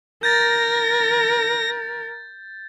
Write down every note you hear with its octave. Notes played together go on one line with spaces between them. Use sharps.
A#4 G6 A6 A#6